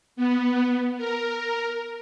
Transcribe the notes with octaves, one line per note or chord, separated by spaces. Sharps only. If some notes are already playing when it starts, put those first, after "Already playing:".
B3
A#4